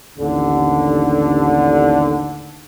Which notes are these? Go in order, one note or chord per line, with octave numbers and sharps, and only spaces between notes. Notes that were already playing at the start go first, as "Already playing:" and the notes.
A1 D#2 D3